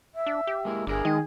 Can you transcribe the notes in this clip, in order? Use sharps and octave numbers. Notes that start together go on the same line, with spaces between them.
E5
D4
G4
G#3 A#3 E4
G1 D4 E4 G#4 A#4
D#3 G#3 D#5